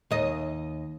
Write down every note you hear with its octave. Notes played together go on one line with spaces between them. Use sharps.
D#2 D#5